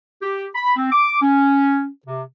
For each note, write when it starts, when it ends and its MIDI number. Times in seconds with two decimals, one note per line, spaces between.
0.22 0.45 67
0.55 0.73 83
0.77 0.91 60
0.92 1.17 86
1.21 1.86 61
2.06 2.22 48